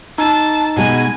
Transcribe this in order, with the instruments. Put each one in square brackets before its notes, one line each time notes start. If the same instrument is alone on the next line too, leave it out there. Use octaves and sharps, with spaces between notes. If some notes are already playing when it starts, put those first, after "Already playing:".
[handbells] D#4 [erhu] A5
[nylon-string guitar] B2 G#3 [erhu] G#5